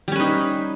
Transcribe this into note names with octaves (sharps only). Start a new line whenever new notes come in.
G3 C#4 D#4 B4